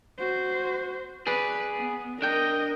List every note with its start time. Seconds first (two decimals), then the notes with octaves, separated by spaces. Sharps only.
0.19 F#4 C5
1.27 G#4 B4 D5
1.76 B3
2.22 D4 A#4 D#5 G5